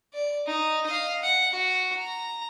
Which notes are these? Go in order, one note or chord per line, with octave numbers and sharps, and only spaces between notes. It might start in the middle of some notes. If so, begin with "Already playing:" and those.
D5
D#4
D#5 F5
F#5
F#4
A#5